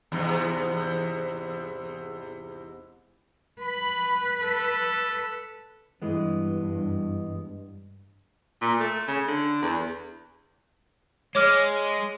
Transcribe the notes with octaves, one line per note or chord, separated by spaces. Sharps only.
E2 G#2 C3
B4 B5
A4
G2 E3 G#3 B3
A#2
A3
C#3
D3
E2
G#3 C#5 D6 F6